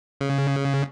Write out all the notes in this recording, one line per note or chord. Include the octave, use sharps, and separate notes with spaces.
C#3